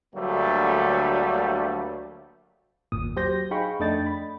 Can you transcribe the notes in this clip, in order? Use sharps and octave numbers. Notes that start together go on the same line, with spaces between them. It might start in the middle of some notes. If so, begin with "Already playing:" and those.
D2 D3 F#3 G3 A3 A#3
G1 D#2 A#2 D#6
F#3 G4 C5 G6 A#6
D#4 G#4 F5 G5 B5 C#6
F2 A3 D4 D#5 G5 A6
B5